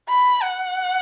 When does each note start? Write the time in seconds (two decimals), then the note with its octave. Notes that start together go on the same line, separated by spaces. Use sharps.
0.09 B5
0.43 F#5